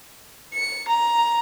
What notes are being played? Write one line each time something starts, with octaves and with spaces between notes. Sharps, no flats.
C#7
A#5